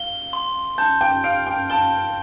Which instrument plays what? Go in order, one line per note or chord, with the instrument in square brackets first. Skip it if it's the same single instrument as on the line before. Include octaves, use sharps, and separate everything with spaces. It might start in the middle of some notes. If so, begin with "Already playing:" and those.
Already playing: [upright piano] F5 [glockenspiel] G7
[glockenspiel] C6
[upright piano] A5 [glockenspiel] G6
[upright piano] G5
[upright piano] F5 [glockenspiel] D7
[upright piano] G5
[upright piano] A5 [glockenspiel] G7